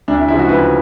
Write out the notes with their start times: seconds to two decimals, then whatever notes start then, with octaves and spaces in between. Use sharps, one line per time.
0.08 D2 D4
0.18 E4
0.28 C#3 F3 G#3 E4
0.39 F#4
0.49 D2 B4